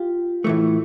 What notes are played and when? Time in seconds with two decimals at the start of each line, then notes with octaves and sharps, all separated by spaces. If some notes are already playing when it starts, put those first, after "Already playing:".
Already playing: F4 G4
0.44 A2 E3 A3